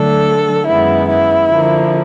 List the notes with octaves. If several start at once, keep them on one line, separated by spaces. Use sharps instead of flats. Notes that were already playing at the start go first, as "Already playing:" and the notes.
Already playing: D3 F#3 A3 D4 A4
F#2 D#3 G#3 B3 E4
E4
D3 F3 A#3